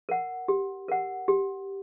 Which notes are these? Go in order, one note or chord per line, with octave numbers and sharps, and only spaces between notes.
A#4 F#5
G4
A#4 F#5
G4